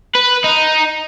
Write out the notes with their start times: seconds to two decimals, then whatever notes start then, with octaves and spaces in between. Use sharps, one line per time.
0.15 B4
0.44 D#4